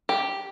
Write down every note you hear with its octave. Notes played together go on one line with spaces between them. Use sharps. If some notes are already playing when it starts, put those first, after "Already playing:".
G4